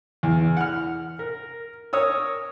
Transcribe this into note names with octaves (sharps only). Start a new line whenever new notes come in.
E2
F#5 F6
A#4
A#4 C#5 D#6 E6